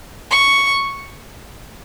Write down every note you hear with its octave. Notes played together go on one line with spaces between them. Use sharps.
C#6